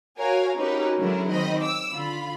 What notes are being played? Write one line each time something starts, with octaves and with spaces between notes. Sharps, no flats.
F#4 A#4 C#5 F5 G#5
C#4 D#4 F#4 G4 A#4 B4
D3 F#3 G#3 C#4 E4 A#4
D#3 C4 D#5 B5
D6 E6
D3 F4 B5